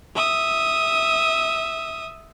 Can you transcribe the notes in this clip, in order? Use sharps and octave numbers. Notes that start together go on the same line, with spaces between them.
E5 D#6